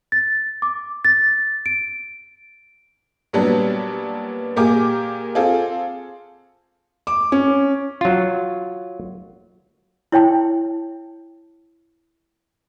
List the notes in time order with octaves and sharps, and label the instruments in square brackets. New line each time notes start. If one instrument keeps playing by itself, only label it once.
[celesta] A6
D6
A6
D7
[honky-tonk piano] A#2 F#3 G3 B3 D4
A#2 A#3 G4 G#4 A#4 D6
C4 F4 G#4 A4
[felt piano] D6
C#4
[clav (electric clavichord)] F#3 F4
[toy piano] E4 C#5 G5 A5